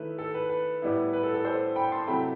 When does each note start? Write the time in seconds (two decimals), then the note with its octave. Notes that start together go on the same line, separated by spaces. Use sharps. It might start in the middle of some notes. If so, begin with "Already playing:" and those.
Already playing: D#3 A3 E4 B4
0.18 A4
0.34 B4
0.49 B4
0.82 A2 G3 B3 E4
1.13 B4
1.23 A4
1.34 A4
1.44 A4 C5
1.76 G5 B5
1.92 A5 C6
2.07 C3 F#3 A3 E4 G5 B5